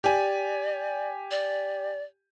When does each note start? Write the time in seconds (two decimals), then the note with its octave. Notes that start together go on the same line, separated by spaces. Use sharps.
0.04 G4 D5 G#5
1.31 D5